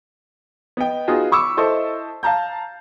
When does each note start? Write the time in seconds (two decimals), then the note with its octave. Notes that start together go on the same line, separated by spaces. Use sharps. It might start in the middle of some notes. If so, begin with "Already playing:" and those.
0.77 B3 D#5 G5
1.08 B3 D#4 F4 F#4 G#4
1.32 B5 C#6 D6 E6
1.57 E4 A4 C5 D#5 A5 C#6
2.23 F5 A5 A#5 G6